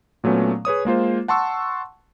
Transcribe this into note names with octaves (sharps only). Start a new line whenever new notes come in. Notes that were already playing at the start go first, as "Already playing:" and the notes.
A#2 F#3 A3 B3 C#4
G#4 B4 C#5 D#6
G#3 A#3 F4 C5
F#5 A5 C6 C#6 E6